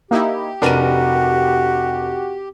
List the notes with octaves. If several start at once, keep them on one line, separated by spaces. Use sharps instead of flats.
A#3 D#4 E4 G4
F1 D4 F#4 A#4 B4 D#7